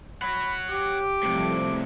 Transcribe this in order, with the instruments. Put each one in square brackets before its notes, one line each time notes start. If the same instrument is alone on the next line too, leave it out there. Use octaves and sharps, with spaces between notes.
[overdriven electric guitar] C#5 F#5 [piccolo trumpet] B5
[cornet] G4 [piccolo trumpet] D6
[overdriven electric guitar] A2 C3 [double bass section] F3 G3 A3